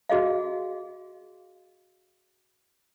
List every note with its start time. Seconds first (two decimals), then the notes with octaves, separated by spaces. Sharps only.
0.09 F#4 G#4 D#5 F5